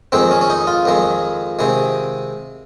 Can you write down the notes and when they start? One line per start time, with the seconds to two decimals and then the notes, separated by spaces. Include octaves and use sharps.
0.12 F2 D#3 G#3 C4
0.31 C#4
0.41 C#4
0.50 D#4
0.67 F4
0.85 F2 D#3 G#3
1.59 C3 D#3 G#3